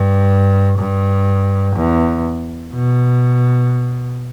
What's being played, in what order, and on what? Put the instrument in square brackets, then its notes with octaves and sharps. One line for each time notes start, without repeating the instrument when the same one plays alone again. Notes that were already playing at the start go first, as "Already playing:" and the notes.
Already playing: [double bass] G2
G2
E2
B2